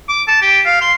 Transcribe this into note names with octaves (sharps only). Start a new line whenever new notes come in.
D6
A5
G4
F5
C6